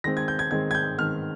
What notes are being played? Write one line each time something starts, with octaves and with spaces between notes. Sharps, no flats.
D#3 G#3 C4 A#6
G#6
G6
G#6
D#3 G#3 C4 G#6
G#6
G6
D#3 G#3 C4 F6